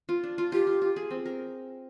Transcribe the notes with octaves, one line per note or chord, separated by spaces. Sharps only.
F4
D4
F4
F4 G4
F4
F4
G#4
C4
A#4